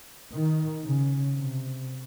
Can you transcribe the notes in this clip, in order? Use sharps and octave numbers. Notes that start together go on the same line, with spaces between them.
D#3
C#3
C3